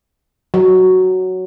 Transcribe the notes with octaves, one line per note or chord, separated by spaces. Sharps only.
F#3